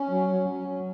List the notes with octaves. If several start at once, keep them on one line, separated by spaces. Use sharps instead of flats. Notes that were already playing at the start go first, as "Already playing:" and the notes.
Already playing: C#4
F#3
F#3
F#3
F#3